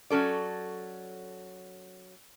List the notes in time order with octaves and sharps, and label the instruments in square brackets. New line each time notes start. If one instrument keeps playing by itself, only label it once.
[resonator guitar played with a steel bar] F#3 C#4 A4 D5